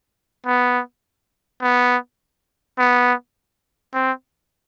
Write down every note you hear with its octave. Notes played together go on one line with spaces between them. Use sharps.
B3
B3
B3
C4